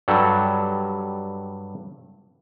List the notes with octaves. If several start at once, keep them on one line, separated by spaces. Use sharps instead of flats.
G2 F#3 G3 A4